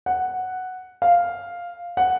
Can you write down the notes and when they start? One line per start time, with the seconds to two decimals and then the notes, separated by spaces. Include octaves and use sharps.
0.06 F#5
1.02 F5
1.97 F#5